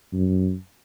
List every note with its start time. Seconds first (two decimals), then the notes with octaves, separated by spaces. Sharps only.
0.13 F#2